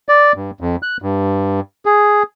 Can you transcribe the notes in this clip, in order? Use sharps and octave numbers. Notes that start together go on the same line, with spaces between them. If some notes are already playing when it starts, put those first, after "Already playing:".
D5
G2
F2
F#6
G2
G#4